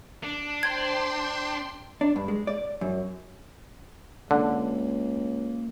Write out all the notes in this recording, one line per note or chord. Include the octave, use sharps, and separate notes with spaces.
D4
C5 G5 C6 G#6
D4
G2
G#3
D5
F#2
C#2 D3 A#3